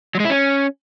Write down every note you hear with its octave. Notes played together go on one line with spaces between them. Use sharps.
F#3
G#3
E4
C#4